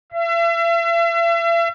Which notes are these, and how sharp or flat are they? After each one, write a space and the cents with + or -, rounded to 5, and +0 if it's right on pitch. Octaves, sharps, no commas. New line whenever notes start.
E5 +40